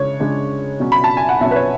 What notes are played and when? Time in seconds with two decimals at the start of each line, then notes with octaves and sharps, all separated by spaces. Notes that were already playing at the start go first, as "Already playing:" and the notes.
Already playing: C#3 G#3 D4 C#5
0.19 C#3 G#3 D4
0.80 B2 F#3 C#4
0.92 B5
1.04 A5
1.17 G#5
1.29 F#5
1.41 B2 F#3 C#4 E5
1.51 B4
1.56 C#5